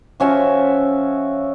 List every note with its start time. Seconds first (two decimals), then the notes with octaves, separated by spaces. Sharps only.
0.20 F3 C#4 F#4 E5